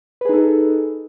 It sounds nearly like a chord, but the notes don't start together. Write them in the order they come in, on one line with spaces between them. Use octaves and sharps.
B4 G#4 D#4 A4